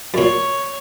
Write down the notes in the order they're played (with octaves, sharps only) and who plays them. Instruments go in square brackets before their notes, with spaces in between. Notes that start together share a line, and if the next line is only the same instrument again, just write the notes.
[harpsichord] F#2 A#2 [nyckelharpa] C#5